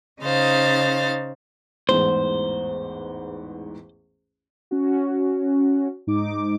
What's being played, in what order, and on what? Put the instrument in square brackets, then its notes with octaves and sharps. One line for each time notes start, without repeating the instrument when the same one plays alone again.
[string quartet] C#3 D#4 C5 F5 A6
[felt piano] A1 E2 G#2 [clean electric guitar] C5
[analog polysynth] C#4 F#4
G#2 D#4 D6